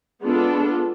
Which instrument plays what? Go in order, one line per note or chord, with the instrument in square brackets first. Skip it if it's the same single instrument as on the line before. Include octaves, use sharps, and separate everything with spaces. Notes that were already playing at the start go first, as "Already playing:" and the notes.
[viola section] G#3 B3 D4 F4 A4